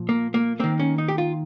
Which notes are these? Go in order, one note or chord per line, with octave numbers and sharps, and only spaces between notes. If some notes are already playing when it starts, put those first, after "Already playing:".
Already playing: A#2 F3
A#3
A#3
D#3 A#3 C4
C#4
D#4
G4
F4